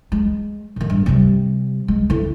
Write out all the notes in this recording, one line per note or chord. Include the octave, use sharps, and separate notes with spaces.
G#3
A2 D#3
G2
C3 G3
G#3
D3 E4